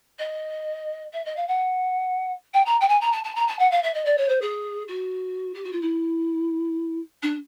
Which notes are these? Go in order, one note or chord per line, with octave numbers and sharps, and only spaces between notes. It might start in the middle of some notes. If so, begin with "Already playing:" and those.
D#5
E5
D#5
F5
F#5
G5
A#5
G5
G#5
A#5
A5
A5
A#5
A5
F#5
F5
E5
D#5
D5
C#5
C5
G#4
F#4
G4
F#4
F4
E4
D4